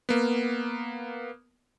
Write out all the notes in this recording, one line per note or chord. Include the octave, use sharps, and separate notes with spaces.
A#3 B3